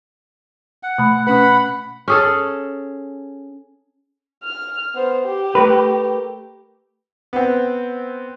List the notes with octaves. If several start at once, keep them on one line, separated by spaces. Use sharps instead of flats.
F#5
B2 A3 B5
B2 C#4 B4 F#5 B5
C#4 G#4 A4
F6
B3 C5
G4
A3 A#4 B4
B3 C4